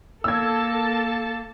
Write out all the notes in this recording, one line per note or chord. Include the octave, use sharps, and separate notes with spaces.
A#3 A4 A5 E6 G#6